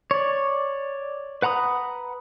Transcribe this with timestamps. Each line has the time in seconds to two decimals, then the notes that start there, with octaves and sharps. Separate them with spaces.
0.11 C#5 D5
1.42 B4 F#5 A#5 B5 D#6